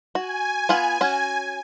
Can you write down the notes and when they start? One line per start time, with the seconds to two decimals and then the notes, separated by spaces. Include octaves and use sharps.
0.15 F#4 G#5
0.69 B3 F4 F#5
1.01 C#4 F#4